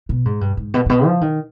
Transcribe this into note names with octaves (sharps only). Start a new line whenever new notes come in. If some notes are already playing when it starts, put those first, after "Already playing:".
B2
G#2
G2
G#2
B2
G#2
B2
F3
D#3